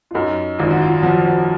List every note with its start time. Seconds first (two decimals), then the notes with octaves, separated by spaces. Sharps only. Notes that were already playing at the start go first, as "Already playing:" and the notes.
0.11 F4
0.14 F#2 D#4
0.59 G#1 F4
0.70 F#4
0.82 F4
1.03 F3 F#4
1.25 F#4